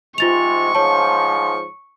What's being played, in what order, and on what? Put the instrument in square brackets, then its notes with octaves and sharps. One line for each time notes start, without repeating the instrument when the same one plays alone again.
[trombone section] G#2 C3 G#3 [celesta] F4 A6 F7 [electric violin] C#6
[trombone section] G#2 F3 [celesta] C#5 A5